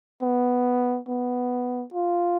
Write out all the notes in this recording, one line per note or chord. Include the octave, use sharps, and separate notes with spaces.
B3
B3
F4